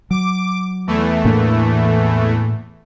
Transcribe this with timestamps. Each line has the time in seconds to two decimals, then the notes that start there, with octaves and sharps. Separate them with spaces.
0.11 F#3 D6
0.87 E2 E3 A3
1.25 A2 A#3 D4